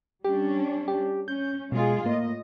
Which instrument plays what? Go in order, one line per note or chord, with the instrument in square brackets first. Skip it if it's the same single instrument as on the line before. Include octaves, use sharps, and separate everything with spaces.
[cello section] G3 C#4 D4 [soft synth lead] G4
[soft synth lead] G4
[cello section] C#4 [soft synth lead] G6
[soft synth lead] B2 [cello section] G#3 F4 G#4
[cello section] A2 D#5 [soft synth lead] A#3